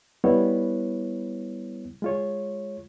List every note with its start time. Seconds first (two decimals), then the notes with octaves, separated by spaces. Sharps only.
0.24 G3 B3 E4 C#5
2.02 G#3 F4 C#5